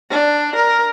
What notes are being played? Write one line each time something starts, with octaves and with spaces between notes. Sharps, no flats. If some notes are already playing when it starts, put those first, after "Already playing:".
D4
A#4